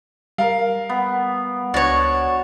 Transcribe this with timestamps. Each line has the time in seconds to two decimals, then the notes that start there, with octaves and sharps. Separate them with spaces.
0.38 G3 A#4 F5
0.89 B3
1.74 C#2 D4 F#4 C#5